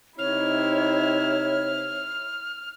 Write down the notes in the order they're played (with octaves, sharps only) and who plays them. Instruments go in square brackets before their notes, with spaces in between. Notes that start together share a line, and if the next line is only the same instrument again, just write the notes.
[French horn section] C3 C4 D#4 [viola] E4 [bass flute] C#5 [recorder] F6